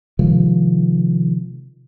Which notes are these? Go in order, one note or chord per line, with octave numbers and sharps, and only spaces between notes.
C3 D#3 F3 G#3